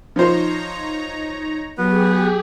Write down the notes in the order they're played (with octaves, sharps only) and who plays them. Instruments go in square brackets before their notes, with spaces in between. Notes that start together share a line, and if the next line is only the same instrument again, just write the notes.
[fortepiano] F3 C5 [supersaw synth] D#4 C#5 A#5
[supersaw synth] F#3 [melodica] B3 B4 [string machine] G4 G#4